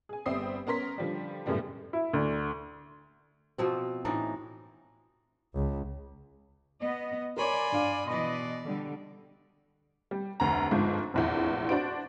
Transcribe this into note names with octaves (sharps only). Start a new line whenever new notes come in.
G#4 G#5
G1 G3 C4 E5 D#6 C7
B3 C#4 A#4 C6 B6
D3 F3 G3
F#2 A2 C#3 G3 B3
E4
D2
B2 F3 C4
A2 E3 D4 D#4
C#2
B3 D#5
A#4 C#5 D5 G#5 B5 C6
G2 F5
B2 E3 D5 D#5 B5
D3 G3
G3
F1 D2 A#5
G1 G#2 F3 F4
F1 A#1 E2
D4 F#4 C5 D7